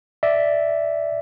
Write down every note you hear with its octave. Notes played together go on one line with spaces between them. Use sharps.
D5 E5